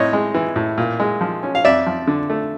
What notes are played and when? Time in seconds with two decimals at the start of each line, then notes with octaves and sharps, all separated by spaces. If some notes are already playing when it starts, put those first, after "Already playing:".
Already playing: A2 C4 C#5 D#5
0.13 G#3
0.34 E3
0.56 A2
0.78 A#2
1.00 G#3
1.21 F3
1.43 C#4
1.55 F5
1.65 F2 D5 E5
1.86 F3
2.07 D3
2.30 A3